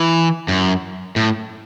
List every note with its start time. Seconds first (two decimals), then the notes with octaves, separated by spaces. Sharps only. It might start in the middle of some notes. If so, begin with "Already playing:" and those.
Already playing: E3
0.48 F#2
1.16 A2